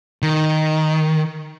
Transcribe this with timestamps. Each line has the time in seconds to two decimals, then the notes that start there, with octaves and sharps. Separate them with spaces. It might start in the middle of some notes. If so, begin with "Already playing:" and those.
0.22 D#3